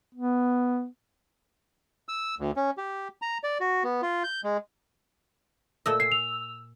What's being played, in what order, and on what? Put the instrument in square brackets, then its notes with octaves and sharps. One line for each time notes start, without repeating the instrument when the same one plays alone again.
[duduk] B3
[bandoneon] E6
D2
C#4
G4
A#5
D5
F#4
B3
F4
G6
G#3
[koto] A#2 A3 D#5 [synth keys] E6
[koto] G#5 [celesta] C7
[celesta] F7